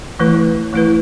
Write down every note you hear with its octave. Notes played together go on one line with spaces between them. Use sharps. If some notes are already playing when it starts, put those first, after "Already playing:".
E3 A3 E4 B4
E3 A3 E4 B4